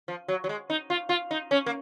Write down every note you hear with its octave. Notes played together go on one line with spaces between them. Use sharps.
F3
F#3
F#3
G#3
D#4
F4
F4
D#4
C#4
A#3